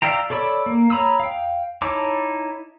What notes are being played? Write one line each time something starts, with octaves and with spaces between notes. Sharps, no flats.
D5 E5 F5 G5 A#5
A4 C#5 D5 B5 E6
A#3
C#5 A#5 B5 D#6 E6
F5 G5
D#4 E4 C#5 A5 D6